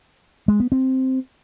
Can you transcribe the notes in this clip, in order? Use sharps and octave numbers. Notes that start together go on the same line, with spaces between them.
G#3
B3
C4